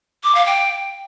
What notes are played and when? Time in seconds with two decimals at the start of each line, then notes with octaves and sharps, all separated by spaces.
0.24 D6
0.35 F5
0.46 G5